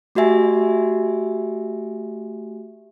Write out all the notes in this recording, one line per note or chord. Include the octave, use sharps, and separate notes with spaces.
A3 F#4 G4 E5 G#5